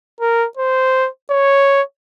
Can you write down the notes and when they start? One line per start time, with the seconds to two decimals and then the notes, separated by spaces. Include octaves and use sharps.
0.20 A#4
0.57 C5
1.30 C#5